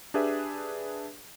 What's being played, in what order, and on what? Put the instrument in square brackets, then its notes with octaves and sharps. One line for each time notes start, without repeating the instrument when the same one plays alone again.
[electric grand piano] D4 G4 G#4 B4 E5